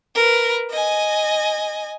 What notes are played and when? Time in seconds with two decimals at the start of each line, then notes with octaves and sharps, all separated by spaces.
0.15 A#4 B4
0.71 D#5 G#5